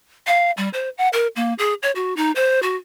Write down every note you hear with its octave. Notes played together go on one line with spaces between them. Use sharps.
F5
G3
C5
F#5
A#4
A#3
G#4
C#5
F#4
D#4
C5
F#4